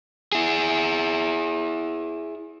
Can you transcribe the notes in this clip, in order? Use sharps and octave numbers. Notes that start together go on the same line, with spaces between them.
E4 G#4